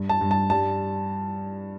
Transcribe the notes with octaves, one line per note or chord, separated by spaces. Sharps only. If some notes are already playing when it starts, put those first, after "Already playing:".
Already playing: G2
A5
G2
A5
G3 A5